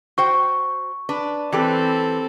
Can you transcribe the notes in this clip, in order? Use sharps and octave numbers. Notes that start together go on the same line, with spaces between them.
F#4 C5 G5 C#6
D4 B4
E3 C4 G4 A4 B4